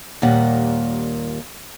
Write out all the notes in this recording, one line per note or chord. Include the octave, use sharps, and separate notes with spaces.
D#2 A#2 G3 F#5